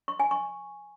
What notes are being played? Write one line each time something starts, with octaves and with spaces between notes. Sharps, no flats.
C#6
G#5
C#6